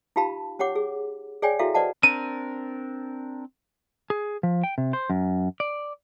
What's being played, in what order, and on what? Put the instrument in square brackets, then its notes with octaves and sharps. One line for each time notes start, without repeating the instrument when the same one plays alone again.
[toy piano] D#4 F4 G4 F5 A5 B5
C#4 G4 C#5 F#5 D6
G#4
G#4 C#5 D5 G5 G#5
E4 F#4 A4 E5 F5
B4 C5 D5 D#5 F#5 A5
[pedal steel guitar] C4 D4 A#4 [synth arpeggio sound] D#7
[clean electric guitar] G#4
F3
G5
C3
C5
F#2
D5